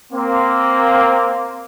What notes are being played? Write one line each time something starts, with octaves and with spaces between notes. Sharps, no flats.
A#3 C4